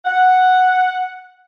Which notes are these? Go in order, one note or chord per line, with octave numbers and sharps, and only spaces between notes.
F#5